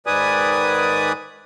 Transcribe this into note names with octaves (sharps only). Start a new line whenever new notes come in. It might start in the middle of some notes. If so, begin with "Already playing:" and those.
G#2 D#3 B4 D5 G#5 D#6